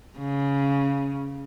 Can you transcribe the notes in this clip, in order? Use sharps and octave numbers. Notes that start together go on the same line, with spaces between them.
C#3